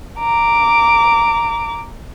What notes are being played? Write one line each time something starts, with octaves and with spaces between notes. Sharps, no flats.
A#5 D6